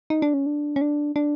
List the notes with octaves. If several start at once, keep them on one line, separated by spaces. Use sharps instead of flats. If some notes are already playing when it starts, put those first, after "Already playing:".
D#4
D4
C#4
D4
C#4
D4
D4